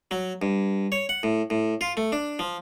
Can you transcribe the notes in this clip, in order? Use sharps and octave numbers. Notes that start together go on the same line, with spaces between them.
F#3
G2
C#5
F#5
A2
A2
F4
A3
D4
F3